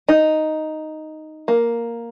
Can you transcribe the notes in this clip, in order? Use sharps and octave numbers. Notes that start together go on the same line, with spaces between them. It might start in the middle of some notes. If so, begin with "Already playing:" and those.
D#4
A#3